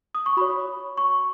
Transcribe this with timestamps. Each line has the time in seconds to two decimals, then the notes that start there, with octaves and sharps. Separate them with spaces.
0.15 D#6
0.26 C#6
0.37 F#4 C#5 B5
0.97 C#6